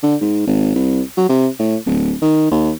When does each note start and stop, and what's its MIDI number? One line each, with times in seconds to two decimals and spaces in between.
0.03 0.16 50
0.21 0.43 44
0.47 0.75 32
0.76 1.01 36
1.17 1.28 54
1.29 1.48 48
1.59 1.77 45
1.86 2.14 26
2.22 2.50 51
2.51 2.72 39